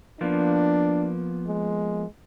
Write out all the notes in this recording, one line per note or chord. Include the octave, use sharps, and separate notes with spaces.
F3 A#3 B3 D4
G#3